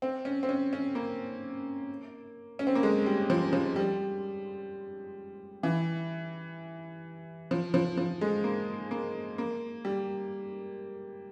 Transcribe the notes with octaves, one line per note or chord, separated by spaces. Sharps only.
C4
C#4
C4
C#4
C#4
A#3
C#4
C4
A#3
G#3
G3
F3
F3
G3
E3
F3
F3
F3
G#3
A#3
A#3
A#3
G3